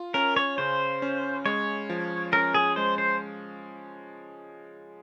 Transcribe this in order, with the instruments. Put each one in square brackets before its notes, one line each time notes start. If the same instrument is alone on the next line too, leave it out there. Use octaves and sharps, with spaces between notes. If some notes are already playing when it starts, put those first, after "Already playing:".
Already playing: [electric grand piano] F4
[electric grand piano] C#4 [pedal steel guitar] A#4
[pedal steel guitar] C#5
[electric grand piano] C#3 [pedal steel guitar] C5
[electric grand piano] C#4
[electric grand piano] G#3 [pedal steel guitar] C#5
[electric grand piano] F3
[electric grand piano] C#4 [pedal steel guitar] A#4
[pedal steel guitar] G#4
[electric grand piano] G#3 [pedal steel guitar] C5
[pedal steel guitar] C5